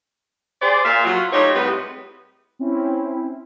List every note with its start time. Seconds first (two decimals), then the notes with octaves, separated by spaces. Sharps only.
0.62 G#4 C5 D5
0.85 A#2 E5 F5
1.05 F#3 F4
1.33 A3 D#4 F4 G4 C#5
1.55 A2 G3 G#3 B3 C4 B4
2.59 C4 C#4 E4